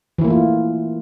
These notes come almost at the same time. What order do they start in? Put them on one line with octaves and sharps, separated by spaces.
E3 E4 A#3 A3 F4